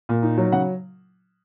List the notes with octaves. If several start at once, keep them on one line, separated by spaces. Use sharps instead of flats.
A#2
D#4
F#3
C#3 F#5